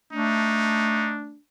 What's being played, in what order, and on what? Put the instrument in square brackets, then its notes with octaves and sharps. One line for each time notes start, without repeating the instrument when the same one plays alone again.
[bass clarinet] A3 [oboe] D4 [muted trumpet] D#4